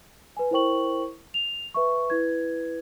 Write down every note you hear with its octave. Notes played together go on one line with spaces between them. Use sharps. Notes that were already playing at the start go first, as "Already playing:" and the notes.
B4 G#5
E4 A#4 C5 G5 C#6 F#7
F7
B4 E5 C#6
E4 B4 G#6